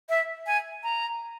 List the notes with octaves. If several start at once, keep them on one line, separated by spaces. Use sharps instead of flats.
E5
G#5
A#5